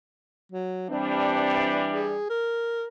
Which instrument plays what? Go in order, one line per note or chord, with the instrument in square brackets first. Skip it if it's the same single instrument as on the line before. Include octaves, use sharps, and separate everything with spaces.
[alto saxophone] F#3
[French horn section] E3 G3 D4 [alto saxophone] C4
[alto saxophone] G#4
A#4